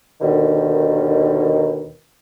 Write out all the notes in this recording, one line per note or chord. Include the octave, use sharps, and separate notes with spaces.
D#2 B2 D3 D#3